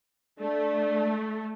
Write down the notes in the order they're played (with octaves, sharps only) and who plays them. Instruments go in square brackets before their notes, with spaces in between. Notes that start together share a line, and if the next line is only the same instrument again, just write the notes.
[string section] A3 [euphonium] D4